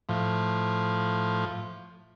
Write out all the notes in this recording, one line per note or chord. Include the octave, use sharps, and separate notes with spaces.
A2 F3